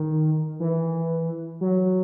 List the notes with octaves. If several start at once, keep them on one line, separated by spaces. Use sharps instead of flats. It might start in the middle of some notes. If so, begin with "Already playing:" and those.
Already playing: D#3
E3
F#3